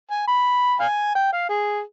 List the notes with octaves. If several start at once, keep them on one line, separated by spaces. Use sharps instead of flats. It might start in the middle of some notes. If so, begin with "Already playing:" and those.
G#5
B5
F5 G#5
G5
F5
G#4